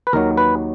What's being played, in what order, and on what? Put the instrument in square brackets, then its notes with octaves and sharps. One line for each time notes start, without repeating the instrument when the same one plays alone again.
[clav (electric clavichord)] B4
D#2 D#3 F#3 A#4
B4